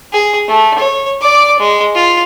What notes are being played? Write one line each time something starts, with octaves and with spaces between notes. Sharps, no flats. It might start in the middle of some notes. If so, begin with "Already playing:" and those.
G#4
A3
C#5
D5 D6
G#3
F4